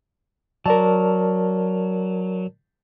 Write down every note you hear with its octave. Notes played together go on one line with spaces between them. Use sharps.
F#3 A#4 D5 A5